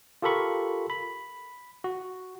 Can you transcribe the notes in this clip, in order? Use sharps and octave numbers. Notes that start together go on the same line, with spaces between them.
F4 G4 A4 A#4 B5 C#6
B5
F#4